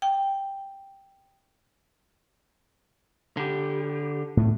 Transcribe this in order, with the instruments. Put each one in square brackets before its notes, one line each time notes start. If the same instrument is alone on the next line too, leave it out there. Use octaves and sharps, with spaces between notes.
[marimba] G5
[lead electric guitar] D3 G4
[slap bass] A2 A3